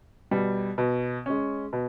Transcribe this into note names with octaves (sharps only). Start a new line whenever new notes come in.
B2 G3
B2
G#3 C#4
B2